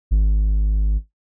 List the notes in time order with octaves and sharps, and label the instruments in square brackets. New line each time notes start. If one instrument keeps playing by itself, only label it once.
[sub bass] G#1